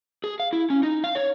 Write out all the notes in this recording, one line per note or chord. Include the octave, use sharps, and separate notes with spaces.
G#4
F5
E4
C#4
D#4
F5
C#5